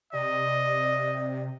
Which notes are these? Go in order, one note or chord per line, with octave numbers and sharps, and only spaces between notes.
C3 D5 D#5